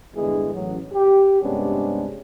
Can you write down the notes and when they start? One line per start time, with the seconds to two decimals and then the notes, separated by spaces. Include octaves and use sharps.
0.15 E2 G2 D3 E3 G#3 G#4
0.54 A1 F#3
0.93 G4
1.42 G2 C3 G#3 B3 C#4 D4